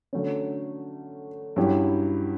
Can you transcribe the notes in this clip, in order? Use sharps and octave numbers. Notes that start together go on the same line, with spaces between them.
D3 F#3 A3 C#4
G2 F#3 C#4 E4 G4